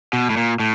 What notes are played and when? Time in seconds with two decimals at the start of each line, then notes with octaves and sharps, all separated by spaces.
0.13 B2
0.30 A2
0.37 A#2
0.60 A2